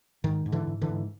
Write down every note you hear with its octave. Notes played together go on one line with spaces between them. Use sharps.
G#2 D#3
G#2
D3 E3
G#2
D3 E3
G#2